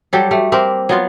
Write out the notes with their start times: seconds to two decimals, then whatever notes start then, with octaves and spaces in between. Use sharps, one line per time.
0.13 F#3 G3 G4 A4
0.31 G3 A3
0.52 A#3 C4 G4 A#4
0.89 F#3 B3 F4